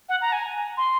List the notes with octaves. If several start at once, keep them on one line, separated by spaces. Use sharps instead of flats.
F#5
A#5
G#5
C6